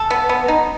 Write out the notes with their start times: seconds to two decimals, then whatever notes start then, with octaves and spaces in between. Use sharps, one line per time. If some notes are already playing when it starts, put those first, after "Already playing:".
Already playing: A4
0.10 B3
0.29 B3
0.48 D#4